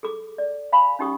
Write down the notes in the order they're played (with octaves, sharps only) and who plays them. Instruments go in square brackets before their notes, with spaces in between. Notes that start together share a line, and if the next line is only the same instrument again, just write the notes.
[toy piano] G#4 A4 D6
D5
F5 G#5 B5
C#4 D#4 G4 C#6 D#6